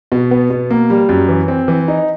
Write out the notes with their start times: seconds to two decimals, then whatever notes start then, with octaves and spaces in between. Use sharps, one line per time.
0.12 B2
0.31 B3
0.50 B2
0.70 A#3
0.90 G3
1.09 F#2
1.29 E3
1.48 C4
1.68 E3
1.88 D#4